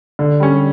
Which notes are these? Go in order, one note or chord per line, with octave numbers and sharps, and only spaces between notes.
D3
G3 C#4